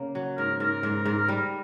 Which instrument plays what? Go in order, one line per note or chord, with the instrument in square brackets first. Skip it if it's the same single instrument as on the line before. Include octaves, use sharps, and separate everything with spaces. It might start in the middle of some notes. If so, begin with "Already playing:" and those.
Already playing: [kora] C#3 A#3
F#3
[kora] G#2 [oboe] A#4
[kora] G#2 [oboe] A#4
[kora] G#2
G#2
G3